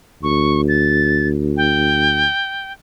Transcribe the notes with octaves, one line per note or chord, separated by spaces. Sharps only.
D2 C#6
A6
G5